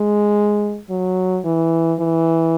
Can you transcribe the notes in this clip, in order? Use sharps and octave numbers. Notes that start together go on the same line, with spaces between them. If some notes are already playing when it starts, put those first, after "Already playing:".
Already playing: G#3
F#3
E3
E3